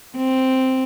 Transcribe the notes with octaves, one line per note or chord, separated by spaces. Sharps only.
C4